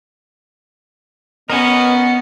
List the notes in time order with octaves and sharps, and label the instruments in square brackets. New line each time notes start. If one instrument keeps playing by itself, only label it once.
[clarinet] B3 [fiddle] C#4 [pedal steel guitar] A#4 B4 [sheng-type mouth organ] D#5